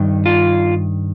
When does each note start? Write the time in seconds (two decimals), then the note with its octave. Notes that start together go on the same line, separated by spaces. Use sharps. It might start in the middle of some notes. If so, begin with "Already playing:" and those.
Already playing: G2 D#3
0.26 F4